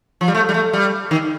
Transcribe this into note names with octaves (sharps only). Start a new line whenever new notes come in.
F3
G3
A3
G3
A3
G3
D#3